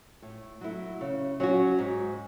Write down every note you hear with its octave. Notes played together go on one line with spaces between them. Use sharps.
A2
F#3 A3 E4
C#3
F#3 C#4 F#4
G#2